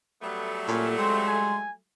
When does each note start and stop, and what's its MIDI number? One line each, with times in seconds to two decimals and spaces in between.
0.22 1.82 54
0.22 1.82 55
0.22 1.82 57
0.22 0.60 59
0.67 0.98 46
0.67 0.87 61
0.98 1.62 56
0.98 1.26 60
0.98 1.56 84
1.28 1.71 80